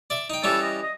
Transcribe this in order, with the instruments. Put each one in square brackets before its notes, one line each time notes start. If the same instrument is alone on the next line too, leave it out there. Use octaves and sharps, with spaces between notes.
[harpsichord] D5 E5
D#4 G5
[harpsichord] E3 G3 C#4 [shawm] A4
[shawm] D#5
D#5